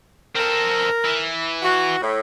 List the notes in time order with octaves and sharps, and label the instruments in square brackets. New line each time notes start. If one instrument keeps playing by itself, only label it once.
[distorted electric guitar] C4 A4 [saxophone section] A#4
[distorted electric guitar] E3
[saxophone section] F#4
A2